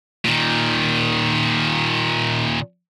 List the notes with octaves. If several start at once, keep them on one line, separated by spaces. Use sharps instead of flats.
A#2 D#3